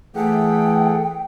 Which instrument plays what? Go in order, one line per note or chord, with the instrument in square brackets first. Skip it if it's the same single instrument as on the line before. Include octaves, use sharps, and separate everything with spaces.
[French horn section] E3 A3 [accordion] G#4 A4 F#5 [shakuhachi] G5